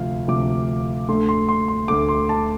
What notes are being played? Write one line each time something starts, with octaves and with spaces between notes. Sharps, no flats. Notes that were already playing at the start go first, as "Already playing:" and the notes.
Already playing: D2 C3 F3 F5
D2 C3 F3 D6
D2 D3 A3 C6
C6
C6
C6
D2 D3 A3 D6
C6
A5